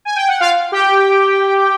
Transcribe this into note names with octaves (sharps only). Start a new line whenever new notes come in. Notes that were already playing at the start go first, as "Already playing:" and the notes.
G#5
G5
F#5
F4 F5
G4 G5